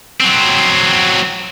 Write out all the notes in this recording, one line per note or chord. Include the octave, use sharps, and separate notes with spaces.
F#3 C4